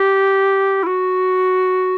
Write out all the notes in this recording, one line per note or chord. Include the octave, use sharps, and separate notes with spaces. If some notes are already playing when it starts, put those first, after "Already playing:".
Already playing: G4
E4
F#4